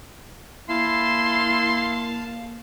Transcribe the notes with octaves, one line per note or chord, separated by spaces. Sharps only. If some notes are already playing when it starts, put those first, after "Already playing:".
A#3 E4 F5 A5 C6